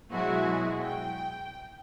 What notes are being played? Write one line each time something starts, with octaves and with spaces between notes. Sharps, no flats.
B2 F#3 G#3 E4 F#4 G#4
G5